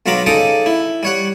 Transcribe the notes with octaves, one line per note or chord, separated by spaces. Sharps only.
B1 F#3 F4 A#5 B5 D6
C#3 D#4 A4 D5 D6 D#6
E4
G3 C#5 F#5